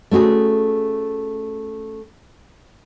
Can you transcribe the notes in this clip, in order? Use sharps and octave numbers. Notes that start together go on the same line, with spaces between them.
A3 C#4 F#4 G#4